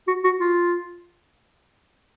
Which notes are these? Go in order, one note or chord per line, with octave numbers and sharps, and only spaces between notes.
F#4
F#4
F4